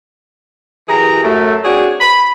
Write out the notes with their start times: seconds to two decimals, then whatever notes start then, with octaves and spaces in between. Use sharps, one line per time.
0.89 F#2 E3 G4 G#4 A#5
1.23 F#2 A3
1.64 C4 D4 F#4 G#4 C#5
2.00 B5